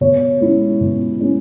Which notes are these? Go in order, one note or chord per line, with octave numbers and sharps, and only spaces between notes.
B2 C#5
G#3 C#4 E4
B2
G#3 C#4 E4